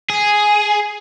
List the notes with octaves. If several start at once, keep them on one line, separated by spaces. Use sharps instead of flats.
G#4